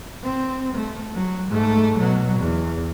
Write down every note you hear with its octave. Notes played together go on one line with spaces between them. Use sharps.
C4
A3
F#3
G#2 A3
B2 F#3
E2